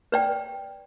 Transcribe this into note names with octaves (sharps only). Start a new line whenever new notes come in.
B4 D5 G5